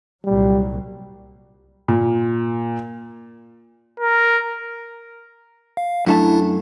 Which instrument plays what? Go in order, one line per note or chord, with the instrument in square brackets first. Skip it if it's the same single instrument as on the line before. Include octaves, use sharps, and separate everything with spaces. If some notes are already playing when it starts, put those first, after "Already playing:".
[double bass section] C2 A#2 F#3 [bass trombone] G3
[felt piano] A#2
[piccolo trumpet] A#4
[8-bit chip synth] F5
[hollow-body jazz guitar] F#2 A3 A5 [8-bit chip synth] D4 E4